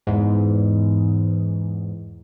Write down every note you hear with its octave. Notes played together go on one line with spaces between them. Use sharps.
E2 G#2